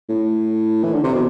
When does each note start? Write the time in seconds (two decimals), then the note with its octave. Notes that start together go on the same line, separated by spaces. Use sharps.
0.09 A2
0.83 E3
0.94 D3
1.03 C3
1.13 B2